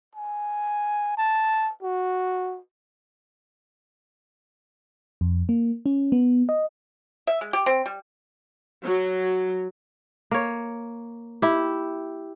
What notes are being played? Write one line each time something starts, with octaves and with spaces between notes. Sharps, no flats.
G#5
A5
F#4
F2
A#3
C#4
B3
D#5
E5
G#3
G4
C4
G3
F#3
A#3 C#5
E4 G4